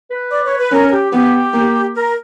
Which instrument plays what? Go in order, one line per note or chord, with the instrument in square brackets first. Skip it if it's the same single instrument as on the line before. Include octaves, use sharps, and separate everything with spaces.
[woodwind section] B4
D5
C#5
B4
[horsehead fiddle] C#4 [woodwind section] A#4
[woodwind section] A#4
G4
[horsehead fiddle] B3 [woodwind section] G4
[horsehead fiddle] A#3
[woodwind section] A#4